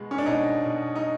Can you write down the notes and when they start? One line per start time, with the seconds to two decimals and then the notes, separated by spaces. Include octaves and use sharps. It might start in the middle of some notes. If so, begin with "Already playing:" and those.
Already playing: B2 G#3 B3
0.11 C#4
0.18 D4
0.26 B2 D#4
0.65 B2
0.95 D#4